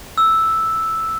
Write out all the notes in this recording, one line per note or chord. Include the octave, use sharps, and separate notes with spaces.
E6